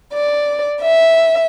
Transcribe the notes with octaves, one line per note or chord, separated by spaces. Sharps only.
D5
E5